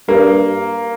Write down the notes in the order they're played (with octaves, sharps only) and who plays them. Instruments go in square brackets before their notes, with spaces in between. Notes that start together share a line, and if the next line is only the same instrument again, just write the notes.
[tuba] G2 [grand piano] A#3